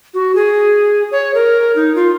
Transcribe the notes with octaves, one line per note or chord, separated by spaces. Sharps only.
F#4
G#4
C#5
A#4
D#4
F4